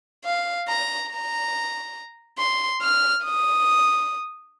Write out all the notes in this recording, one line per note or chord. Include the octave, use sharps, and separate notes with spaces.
F5
A#5
A#5
C6
F6
D#6